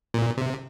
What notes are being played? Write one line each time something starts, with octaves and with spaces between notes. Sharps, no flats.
A#2
C3